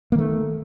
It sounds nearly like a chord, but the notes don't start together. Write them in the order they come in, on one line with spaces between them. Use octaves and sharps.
A#3 D#3 A3